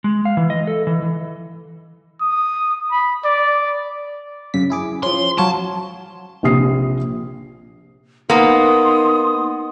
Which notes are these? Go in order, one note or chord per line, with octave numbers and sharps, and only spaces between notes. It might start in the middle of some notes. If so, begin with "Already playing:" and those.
G#3
F5
E3
D#5
A4
E3
E3
D#6
B5
D5
F#2 C#3 B6
E4 G#4 D6
F3 C#4 C6
F#3 F4 C#5 A5
A#1 C3 D#6 C7
A#3 B3 D#4 C6 D#6